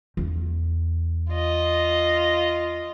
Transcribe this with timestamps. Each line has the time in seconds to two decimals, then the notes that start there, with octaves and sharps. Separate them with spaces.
0.17 E2
1.31 F4 D#5